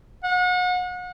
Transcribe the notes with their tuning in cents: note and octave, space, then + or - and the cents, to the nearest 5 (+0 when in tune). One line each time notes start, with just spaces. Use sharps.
F#5 -35